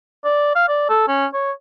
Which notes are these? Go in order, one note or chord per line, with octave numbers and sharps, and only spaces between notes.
D5
F5
D5
A4
C#4
C#5